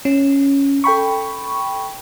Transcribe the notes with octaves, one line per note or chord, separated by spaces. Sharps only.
C#4
A4 G5 B5 C#6